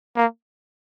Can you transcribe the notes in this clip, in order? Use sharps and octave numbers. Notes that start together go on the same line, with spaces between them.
A#3